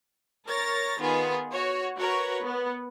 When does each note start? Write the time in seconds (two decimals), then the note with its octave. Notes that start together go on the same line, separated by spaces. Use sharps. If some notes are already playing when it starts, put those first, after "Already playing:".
0.47 A#4 C#5 A6 A#6
1.00 D#3 B3 F4 G#4
1.51 F#4 C#5
1.98 F#4 A#4 B4 C#5
2.43 B3